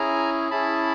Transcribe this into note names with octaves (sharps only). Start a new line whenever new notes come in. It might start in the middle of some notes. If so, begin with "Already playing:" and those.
Already playing: C#4 E4 G#4 G#5 A#5
C#4 E4 G#4 A5 B5